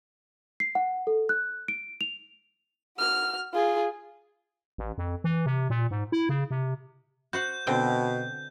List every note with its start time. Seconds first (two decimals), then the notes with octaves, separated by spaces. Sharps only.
0.60 C7
0.75 F#5
1.07 A4
1.29 F#6
1.68 D7
2.01 F7
2.98 F#4 F6
3.53 F4 G#4
4.78 A1
4.98 F2
5.24 E3
5.46 C3
5.70 A#2
5.91 G#2
6.12 E4
6.29 C#3
6.51 C3
7.33 F#4 C5 F#5 G6
7.67 B2 D3 C4 G5